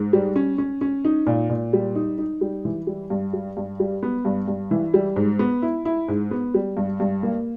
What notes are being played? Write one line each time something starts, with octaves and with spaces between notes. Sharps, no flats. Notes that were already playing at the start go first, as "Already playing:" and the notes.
Already playing: G#2
G3
C#4
C#4
C#4
D#4
A#2
A#2
G3
D#4
D#4
G3
E3
G3
G2
G3
G2
G3
B3
G2
G2
E3
G3
G#2
B3
E4
E4
G#2
B3
G3
G2
G2
A#3